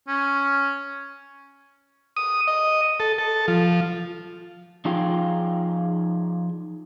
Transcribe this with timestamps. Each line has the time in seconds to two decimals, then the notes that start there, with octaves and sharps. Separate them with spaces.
0.08 C#4
2.17 D#6
2.47 D#5
3.00 A4
3.18 A4
3.48 F3
4.85 F3 D#4 F4 G#4 F5 G5